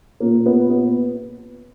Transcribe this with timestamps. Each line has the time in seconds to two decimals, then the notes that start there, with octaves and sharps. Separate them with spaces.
0.20 A#2 A#3
0.38 A#3
0.46 B3
0.69 B3